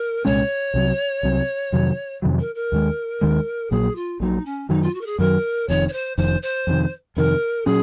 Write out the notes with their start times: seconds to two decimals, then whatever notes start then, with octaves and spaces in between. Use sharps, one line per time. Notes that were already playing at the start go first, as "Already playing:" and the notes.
Already playing: A#4
0.25 C2 A#2 G#3 C#4 C#5
0.74 C2 C3 F#3
1.23 C2 C3 F#3
1.72 F2 C3 D#3 F#3
2.22 F2 C3 D#3 F#3
2.39 A#4
2.55 A#4
2.72 D#2 D#3 G#3
3.21 D#2 D#3 G#3
3.71 A#1 A#2 F#3 G#4
3.95 F4
4.20 A#1 A#2 F#3 D#4
4.45 C#4
4.69 F#2 D#3 F#3 D#4
4.82 F4
4.94 F#4
5.01 A#4
5.06 G#4
5.19 F#2 D#3 F#3 A#4
5.68 F1 F2 D#3 C#5
5.88 C#5
5.93 C5
6.17 F1 F2 D#3 C5
6.42 C5
6.67 F2 C3 D#3
7.16 F2 C3 D#3 A#4
7.66 A#2 F#3 C#4 G#4